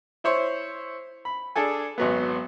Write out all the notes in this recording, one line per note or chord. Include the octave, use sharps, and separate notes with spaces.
E4 C5 C#5 C6
B5
D4 G#4 A4 G#5
G#1 F#3 B3